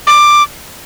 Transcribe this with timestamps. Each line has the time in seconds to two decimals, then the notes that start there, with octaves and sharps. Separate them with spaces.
0.07 D6